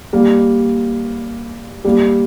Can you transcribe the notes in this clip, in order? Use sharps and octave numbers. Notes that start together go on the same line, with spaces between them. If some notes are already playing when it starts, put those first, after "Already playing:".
G3 A#3
G3 A#3